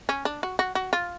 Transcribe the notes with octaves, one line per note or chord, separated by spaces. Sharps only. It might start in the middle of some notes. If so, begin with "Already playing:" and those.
C#4
D4
F#4
F#4
F#4
F4